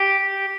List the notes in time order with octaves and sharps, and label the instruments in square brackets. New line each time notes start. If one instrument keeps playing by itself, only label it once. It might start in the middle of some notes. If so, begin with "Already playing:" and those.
Already playing: [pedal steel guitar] G4